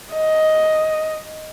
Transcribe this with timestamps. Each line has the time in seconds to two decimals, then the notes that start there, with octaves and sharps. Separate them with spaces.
0.13 D#5